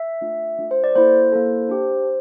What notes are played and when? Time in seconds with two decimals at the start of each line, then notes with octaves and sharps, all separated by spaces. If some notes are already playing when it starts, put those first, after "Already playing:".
Already playing: E5
0.21 A3 D4 F4
0.59 A3 D4 F4
0.71 C5
0.84 D5
0.96 A#3 E4 A4 C5
1.32 A#3 E4 A4
1.69 D4 G4